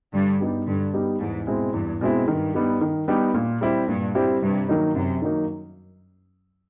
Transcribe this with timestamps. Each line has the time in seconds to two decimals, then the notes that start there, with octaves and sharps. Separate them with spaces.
0.13 G2 D3
0.40 G3 B3 D#4 G4
0.67 G2 D3
0.93 G3 B3 D#4 G4
1.20 E2 G#2
1.47 B2 G#3 C4 E4
1.73 E2 G2
2.01 B2 G#3 C4 E4
2.28 G2 D#3
2.54 G3 B3 D#4 G4
2.81 D#3
3.08 G3 B3 D#4 G4
3.34 A#2
3.61 G3 C4 E4 G4
3.88 G2 A#2
4.15 G3 C4 E4 G4
4.42 G2 C3
4.69 D#3 F#3 A#3 D#4
4.94 F#2 C3
5.22 D#3 F#3 A#3 D#4